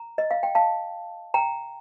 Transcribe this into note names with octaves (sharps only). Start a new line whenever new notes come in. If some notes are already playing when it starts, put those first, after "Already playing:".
Already playing: A#5
D#5
F5
G5
F5 A5
G5 A#5